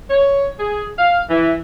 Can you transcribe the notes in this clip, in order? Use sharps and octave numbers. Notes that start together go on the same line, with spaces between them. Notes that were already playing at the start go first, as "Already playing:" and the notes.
C#5
G#4
F5
E3